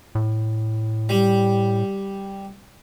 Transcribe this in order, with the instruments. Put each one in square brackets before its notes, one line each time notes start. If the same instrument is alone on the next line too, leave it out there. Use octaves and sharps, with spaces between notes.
[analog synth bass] A2
[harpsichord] G3